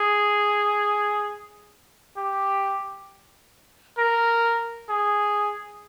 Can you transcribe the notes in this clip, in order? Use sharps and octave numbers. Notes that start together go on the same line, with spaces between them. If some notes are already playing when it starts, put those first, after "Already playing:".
Already playing: G#4
G4
A#4
G#4